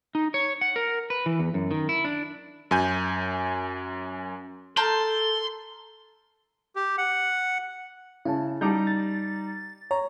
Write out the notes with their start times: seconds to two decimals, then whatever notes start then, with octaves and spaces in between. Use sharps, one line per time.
0.15 D#4
0.34 C#5
0.61 F#5
0.76 A#4
1.10 B4
1.26 E3
1.39 E2
1.54 F#2
1.71 D#3
1.89 E4
2.04 D4
2.71 F#2 G#5 G6
4.77 A4 A#4 A5 C6 G6
6.76 G4
6.98 F#5
8.25 C#3 E4 A5
8.61 G3 D#4 A5 A#5 D6 G6
8.87 A6
9.91 C#5 A#5